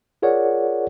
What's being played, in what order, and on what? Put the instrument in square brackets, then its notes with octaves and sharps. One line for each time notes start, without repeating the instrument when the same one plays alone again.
[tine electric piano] F4 G#4 A#4 C#5 D5 F#5